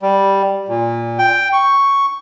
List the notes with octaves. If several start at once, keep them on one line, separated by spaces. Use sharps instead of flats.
G3
A#2
G5
C#6